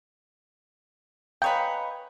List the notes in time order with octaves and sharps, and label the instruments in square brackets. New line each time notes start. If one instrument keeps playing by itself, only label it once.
[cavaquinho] B4 C#5 D#5 [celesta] F5 G#5 A#5 [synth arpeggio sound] G5